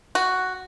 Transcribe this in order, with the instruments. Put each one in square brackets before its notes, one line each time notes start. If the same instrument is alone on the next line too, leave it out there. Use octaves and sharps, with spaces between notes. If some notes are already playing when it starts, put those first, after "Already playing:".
[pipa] F#4